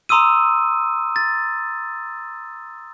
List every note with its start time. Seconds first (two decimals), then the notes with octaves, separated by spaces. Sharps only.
0.09 A#5 C6 D#6 E6 D#7
1.16 A6